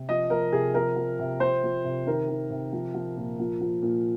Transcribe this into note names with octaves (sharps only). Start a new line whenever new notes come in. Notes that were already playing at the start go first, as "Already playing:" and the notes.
Already playing: C3
F3 D#5
F3 A#4
C3 G#4
F3 A#4
F3
C3
F3 C5
F3
C3
D#3 A#4
D#3
C3
F3
F3
A#2
F3
F3
A#2